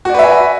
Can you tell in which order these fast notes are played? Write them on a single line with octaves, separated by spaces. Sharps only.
F#4 D5 B4 E5 G#5